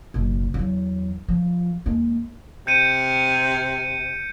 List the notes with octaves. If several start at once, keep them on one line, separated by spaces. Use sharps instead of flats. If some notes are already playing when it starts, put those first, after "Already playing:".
F#1 B1
E2 F#3
F3
D#2 G#3
C3 G6 C#7 D#7